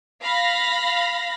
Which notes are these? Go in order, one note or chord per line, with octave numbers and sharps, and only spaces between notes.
F5 B5 A#6